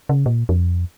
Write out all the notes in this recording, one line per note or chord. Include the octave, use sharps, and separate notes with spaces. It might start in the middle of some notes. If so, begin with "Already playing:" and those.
C#3
A#2
F2